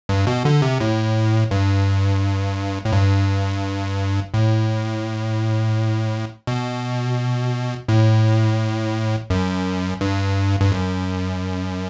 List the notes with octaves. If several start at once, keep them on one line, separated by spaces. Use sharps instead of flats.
G2
B2
D3
C3
A2
G2
A2
G2
A2
B2
A2
F#2
G2
G2
F#2